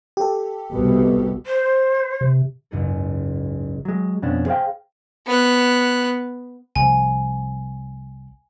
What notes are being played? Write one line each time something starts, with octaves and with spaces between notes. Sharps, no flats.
G4 A4
C2 B2
C5
C3
F#1 C#2 G#2 D#4 G#4 A4
F#3 G#3
F2 B2 C#4 D4
G#4 C5 D#5 F5 G5
B3 F#6
C2 F3 G#5